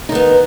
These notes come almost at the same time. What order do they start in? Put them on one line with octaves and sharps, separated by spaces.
D#4 D#3 B3